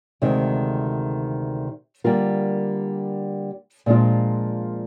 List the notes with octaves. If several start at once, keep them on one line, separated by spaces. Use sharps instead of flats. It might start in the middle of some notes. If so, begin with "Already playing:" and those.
D2 C3 D#3 G#3
D3 G3 A#3 F4 A#4
A#2 F3 G#3 D4 F4